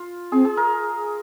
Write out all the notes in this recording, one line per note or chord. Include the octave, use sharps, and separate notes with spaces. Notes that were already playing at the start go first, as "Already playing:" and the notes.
Already playing: F4
C4 G#4
G#4
A#4